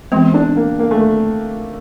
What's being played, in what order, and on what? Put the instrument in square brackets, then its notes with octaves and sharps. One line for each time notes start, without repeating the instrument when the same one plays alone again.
[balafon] E3 G#3 B3 [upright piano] C4
[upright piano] D4
A#3
A#3
A3